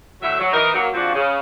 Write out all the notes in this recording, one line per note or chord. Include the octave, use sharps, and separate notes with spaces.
A2 D3 F#3 E5
F#3
E3 D#4 A#4
F#3 A#3
F3 G#3 C4 D4 F4 F#4
C#3